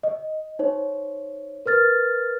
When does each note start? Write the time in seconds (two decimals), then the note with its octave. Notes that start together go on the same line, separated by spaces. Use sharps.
0.03 D#5
0.59 D#4 C5 C#5
1.66 A#4 B4 F6 A6